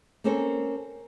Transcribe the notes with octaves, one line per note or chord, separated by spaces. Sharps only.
A#3 C4 C#4 A4 A#4 C5